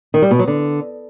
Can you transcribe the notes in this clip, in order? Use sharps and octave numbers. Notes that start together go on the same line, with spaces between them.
D#3
G3
B2
F#3
D3